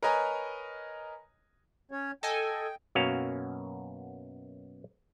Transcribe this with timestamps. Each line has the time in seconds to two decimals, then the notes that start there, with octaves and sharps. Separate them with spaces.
0.02 A#4 B4 C#5 D#5 G#5 A#5
1.91 C#4 C#5
2.23 A4 D#5 G5 G#5
2.95 F#2 B2 A#3 C#4 F#4 F5